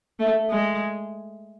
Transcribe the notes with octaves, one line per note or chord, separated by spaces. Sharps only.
A3
G#3